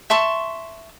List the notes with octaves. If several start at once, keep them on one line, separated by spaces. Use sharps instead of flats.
E5 A5 C6 C#6